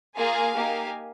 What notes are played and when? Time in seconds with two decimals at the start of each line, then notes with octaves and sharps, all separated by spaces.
0.17 A#3 F4 G#4 F5 G#5
0.56 A#3 D#4 G4